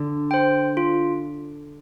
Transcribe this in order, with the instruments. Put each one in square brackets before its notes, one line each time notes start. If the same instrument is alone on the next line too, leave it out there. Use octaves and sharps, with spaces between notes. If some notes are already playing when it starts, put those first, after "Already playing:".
Already playing: [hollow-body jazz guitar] D3
[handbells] C5 G5
F4